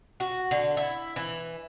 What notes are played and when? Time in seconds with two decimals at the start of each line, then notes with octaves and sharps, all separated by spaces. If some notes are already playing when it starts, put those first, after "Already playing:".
0.20 F#4
0.51 D3
0.77 E4
1.16 E3